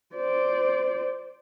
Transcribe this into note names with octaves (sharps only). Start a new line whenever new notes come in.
C5 D5